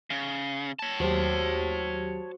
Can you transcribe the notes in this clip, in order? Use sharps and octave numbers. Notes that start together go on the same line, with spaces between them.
C#3
C#5 A5
D#2 F#3 F#4 G4 C5